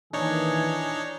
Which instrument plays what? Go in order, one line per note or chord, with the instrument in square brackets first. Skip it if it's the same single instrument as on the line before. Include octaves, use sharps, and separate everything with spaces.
[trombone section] A#2 D#3 E3 [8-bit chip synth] D4 D#4 C#5 [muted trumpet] G#4